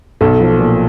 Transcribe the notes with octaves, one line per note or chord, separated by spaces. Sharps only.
B1 A4
F3
A#2